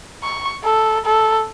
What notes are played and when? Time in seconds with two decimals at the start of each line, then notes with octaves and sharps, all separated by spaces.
0.24 C#6
0.64 A4
1.06 A4